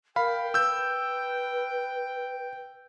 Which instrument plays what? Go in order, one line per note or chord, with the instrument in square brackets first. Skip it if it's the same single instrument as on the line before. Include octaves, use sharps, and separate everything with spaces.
[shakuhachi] A#4 [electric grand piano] F5 B5 [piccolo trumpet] G5
[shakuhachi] B4 [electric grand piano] E6 G6